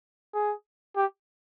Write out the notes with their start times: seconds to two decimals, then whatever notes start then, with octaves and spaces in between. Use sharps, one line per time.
0.34 G#4
0.96 G4